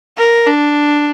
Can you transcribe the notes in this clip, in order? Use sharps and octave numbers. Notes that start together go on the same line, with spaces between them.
A#4
D4